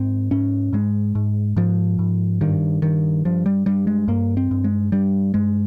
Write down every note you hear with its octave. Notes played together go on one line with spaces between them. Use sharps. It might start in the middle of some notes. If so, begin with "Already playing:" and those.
Already playing: G#2 C4
G#2 C#4
G#2 G#3
G#2
G#2 F3
G#2
G2 D#3
G2 D#3
G2 F3
G3
G2 G3
G#3
G2 A#3
C4
G2
G#3
G2 G3
G2 G#3